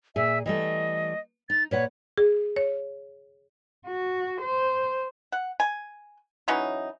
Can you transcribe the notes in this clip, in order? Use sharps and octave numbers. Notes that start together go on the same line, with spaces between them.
A#2 G#4 E5
E3 G3 A3 D#5
D#4 A6
A#2 B4 C#5 F#5
G#4
C#5
F#4
C5
F#5
G#5
E3 F#3 C#4 D#4